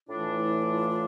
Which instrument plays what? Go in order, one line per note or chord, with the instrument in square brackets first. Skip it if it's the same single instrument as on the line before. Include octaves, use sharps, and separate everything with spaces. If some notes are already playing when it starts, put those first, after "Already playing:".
[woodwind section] A2 E3 A3 D4 [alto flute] F4
[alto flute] E4
F4
F4